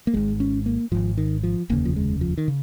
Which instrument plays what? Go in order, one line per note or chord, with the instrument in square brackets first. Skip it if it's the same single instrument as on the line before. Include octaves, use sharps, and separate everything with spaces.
[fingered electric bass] A#3
G#1 G#2 G#3
C#4
A#3
G#1 G#2 F3
D#3
F3
F1 D#2 C#3 A#3
F3
G#3
F3
D#3
C#3